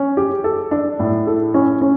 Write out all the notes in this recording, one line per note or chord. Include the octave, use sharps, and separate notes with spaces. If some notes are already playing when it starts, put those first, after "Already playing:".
Already playing: C#4
G4
A4
D4
A2
A4
C#4
C#4